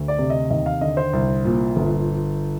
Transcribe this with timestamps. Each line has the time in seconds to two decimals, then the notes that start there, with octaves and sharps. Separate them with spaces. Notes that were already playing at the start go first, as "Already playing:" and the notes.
Already playing: D2
0.08 D5
0.18 C3
0.30 D#5
0.50 D#2 D#5
0.66 F5
0.81 D3 D#5
0.97 C5
1.13 C2
1.45 A#2
1.77 G1